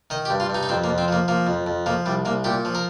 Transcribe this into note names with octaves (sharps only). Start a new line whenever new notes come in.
D#3 D#5
G4
G2
F4
G2 D#4
D#4
F2 C4
A#3
F2
C4
F3 A#3
F3 A#3
F2
F2
F3 A#3
C2 G3
C2 A#3
A#2 G4
F3
A#4